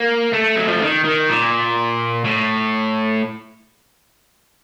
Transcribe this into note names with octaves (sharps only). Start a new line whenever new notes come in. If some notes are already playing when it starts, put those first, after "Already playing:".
Already playing: A#3
A3
F#3
F3
D#3
D#3
A#2
A2